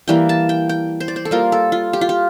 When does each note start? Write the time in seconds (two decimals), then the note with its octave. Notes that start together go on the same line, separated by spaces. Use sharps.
0.08 E3 G3 A#3 G5
0.29 A5
0.49 G5
0.69 G5
1.00 C5
1.08 D5
1.16 C5
1.25 A4
1.31 G3 A#3 F4 A#4
1.52 A4
1.72 F4
1.93 G4
2.01 F4
2.09 G4